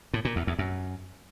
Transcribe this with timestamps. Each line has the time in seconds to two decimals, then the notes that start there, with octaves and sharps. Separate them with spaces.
0.14 A2
0.25 A#2
0.36 E2
0.47 E2
0.59 F#2